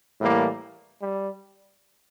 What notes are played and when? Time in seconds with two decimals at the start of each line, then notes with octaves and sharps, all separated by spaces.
0.19 A2 E3 G3 A#3
1.00 G3